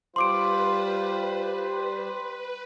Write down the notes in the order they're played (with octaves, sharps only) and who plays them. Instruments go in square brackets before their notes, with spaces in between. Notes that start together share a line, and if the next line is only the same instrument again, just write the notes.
[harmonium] G3 C5 [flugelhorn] F4 [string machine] B4 [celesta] C6 D6 D7